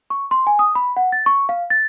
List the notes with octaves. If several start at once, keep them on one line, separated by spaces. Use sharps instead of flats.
C#6
C6
G#5
D#6
B5
F#5
A6
C#6
F5
A6